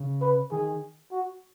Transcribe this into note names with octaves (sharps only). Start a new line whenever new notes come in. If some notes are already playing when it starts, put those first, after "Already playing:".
Already playing: C#3
B4
D#3 G#4
F#4